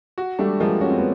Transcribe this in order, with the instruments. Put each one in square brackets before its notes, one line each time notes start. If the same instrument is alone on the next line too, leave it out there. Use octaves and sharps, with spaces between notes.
[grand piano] F#4
[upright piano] G3 A3 [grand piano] D4
[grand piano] F3 [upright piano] G#3 A#3
[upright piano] C#4 [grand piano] F#4
[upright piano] C4
B3